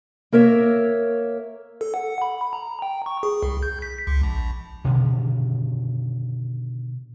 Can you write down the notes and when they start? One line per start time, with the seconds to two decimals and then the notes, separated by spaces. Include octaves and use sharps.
0.32 A#3 A#4 C#5 E5
1.81 A4
1.94 F#5
2.22 B5
2.53 A#5
2.82 G5
3.06 C#6
3.23 G#4
3.43 C2
3.63 G6
3.82 B6
4.07 C#2
4.23 A#1
4.85 B2 D3 D#3